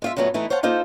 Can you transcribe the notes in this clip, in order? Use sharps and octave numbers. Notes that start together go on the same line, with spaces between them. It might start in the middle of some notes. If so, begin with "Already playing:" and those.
G#3 F4 E5
F#2 A#2 F#3 A3 B3
E3 A3 D#4 E4
C5 C#5 F5 F#5 A5
A#3 D#4 F4 A4 C5